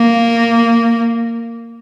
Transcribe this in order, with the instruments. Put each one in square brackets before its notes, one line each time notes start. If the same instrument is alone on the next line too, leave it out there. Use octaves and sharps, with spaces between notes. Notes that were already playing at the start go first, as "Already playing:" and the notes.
Already playing: [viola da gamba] A#3